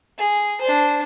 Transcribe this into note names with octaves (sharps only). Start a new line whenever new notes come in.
G#4
D4 C5